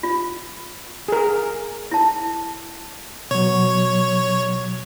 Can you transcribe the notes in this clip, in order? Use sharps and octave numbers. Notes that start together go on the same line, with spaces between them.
F4
G#4 A#4
E4 A5
B2 F#3 C#5